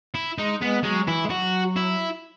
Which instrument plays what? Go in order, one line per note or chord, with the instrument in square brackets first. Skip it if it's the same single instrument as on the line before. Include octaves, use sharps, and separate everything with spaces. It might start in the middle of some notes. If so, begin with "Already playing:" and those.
[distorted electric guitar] E4
[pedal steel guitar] G#3 [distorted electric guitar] D#4
[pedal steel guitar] G#3 [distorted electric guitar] B3
[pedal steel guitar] F#3 [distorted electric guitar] G#3
[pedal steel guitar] E3 [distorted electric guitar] E4
[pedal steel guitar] G#3
[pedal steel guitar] F#3 [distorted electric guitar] F#4
[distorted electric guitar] E4